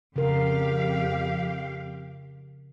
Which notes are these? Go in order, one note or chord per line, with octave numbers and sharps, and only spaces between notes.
F2 C#3 G4 A#4 F5